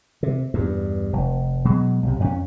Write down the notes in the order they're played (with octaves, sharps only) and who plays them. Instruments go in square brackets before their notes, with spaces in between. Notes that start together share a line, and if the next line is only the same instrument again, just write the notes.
[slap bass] C3
E2 G2
F1
B2 F#3 G#3
B1 C3
F2 A#3 C#4